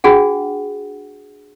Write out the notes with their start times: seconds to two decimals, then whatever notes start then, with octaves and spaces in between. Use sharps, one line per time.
0.04 D4 F#4 G#4 F#5